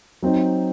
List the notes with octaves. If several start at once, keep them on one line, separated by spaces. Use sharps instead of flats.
F#3 C4 D#4